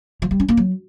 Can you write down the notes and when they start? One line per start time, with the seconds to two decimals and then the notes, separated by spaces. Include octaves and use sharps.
0.22 F3
0.31 G3
0.40 C#4
0.48 A#3
0.57 F#3